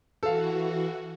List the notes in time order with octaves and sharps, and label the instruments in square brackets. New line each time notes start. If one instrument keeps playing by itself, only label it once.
[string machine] E3 F#4 [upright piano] A4 F5